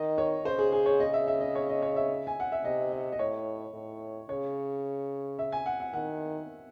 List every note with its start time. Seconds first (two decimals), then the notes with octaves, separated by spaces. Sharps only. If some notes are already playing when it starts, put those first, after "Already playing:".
Already playing: D#3 D#5
0.18 C#5
0.45 C#3 C5
0.59 G#4
0.72 G#4
0.86 C#5
1.00 D#5
1.13 E5
1.28 E5
1.41 D#5
1.55 C#5
1.69 D#5
1.82 C#5
1.96 E5
2.27 G#5
2.40 F#5
2.52 E5
2.64 C3 D#5
2.92 D#5
3.12 D#5
3.19 A2 C#5
3.74 A2
4.29 C#3 C#5
5.39 E5
5.52 G#5
5.66 F#5
5.80 F#5
5.93 D#3 F#5